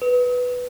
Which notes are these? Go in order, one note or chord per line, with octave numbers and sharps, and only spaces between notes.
B4